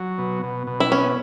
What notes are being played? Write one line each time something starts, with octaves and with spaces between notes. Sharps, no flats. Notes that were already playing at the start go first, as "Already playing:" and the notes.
Already playing: F#3
B2
B2
B2
E4
B3 C#4